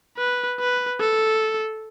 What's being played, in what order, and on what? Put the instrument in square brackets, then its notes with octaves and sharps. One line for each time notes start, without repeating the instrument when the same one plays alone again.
[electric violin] B4
B4
A4